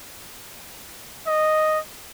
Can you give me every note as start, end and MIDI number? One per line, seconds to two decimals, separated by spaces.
1.27 1.79 75